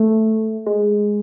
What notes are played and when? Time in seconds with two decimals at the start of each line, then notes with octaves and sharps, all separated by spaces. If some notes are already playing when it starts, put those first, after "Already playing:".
Already playing: A3
0.67 G#3